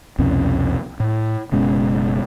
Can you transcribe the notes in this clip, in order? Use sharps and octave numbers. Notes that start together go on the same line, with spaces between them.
C2 F2 B2 C#4
A2
F#1 B2 G#3 C#4